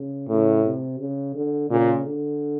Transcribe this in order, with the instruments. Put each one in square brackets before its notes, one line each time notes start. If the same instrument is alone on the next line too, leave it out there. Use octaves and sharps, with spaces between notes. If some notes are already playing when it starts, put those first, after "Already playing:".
Already playing: [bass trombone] C#3
[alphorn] A2 [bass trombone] C#3
[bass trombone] C3
C#3
D3
[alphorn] A#2 [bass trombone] C#3
[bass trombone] D3